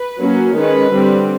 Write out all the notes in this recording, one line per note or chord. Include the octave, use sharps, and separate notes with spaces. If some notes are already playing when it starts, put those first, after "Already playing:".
Already playing: B4
F#3 A#3 C#4
D#3 G#3 C#4 B4
D3 G3 C4